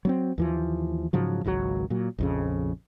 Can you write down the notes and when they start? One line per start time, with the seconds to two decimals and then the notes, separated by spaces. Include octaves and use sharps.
0.05 F#3 B3 C4
0.38 D#2 E3 F3
1.13 G#2 C#3 F3 F#3
1.44 G#1 C#2 D#3 F#3
1.90 A#2 F#3
2.18 A#1 F2 C#3